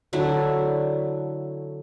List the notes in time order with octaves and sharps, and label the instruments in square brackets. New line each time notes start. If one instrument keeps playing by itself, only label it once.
[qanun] D3 F#3 A3 E4